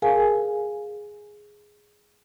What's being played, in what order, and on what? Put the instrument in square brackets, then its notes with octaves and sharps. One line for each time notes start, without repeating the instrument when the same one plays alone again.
[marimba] G#4 A#4 F5 G#5